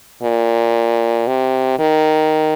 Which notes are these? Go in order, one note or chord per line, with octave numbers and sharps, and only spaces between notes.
A#2
C3
D#3